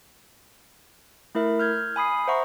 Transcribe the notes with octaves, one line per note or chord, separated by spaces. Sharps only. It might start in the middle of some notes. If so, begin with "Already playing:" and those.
A3 E4 A#4 E5
F6 G6 G#6
G#5 B5 D#6 C7
C5 E5 F#5 A#5 C#6 D#6